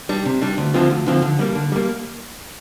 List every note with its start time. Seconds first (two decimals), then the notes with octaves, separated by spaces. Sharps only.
0.09 G3 D4
0.26 C3
0.42 G3 D4
0.58 D2
0.74 D3 F3 C4 F4
0.90 D2
1.06 D3 F3 C4 F4
1.22 D3
1.39 G3 A#3
1.55 D3
1.72 G3 A#3